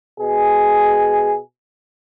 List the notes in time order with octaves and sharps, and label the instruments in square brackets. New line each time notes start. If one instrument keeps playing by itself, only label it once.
[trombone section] B2 G#4